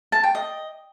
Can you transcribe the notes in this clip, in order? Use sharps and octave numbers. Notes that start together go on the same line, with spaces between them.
A5
G5
D#5